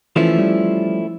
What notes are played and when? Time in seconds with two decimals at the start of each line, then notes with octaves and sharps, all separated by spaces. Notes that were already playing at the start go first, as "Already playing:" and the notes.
0.16 E3 F3 A3 C#4 E4
0.39 G3